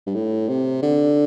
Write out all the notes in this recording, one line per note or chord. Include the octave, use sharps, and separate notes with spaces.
G2
A2
C3
D3